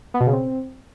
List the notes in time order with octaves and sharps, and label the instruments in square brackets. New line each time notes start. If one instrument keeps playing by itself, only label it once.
[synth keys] B3
B2
C#3
C4